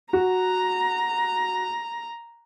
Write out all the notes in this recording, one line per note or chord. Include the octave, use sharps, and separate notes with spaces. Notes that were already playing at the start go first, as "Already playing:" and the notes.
F#4 A#5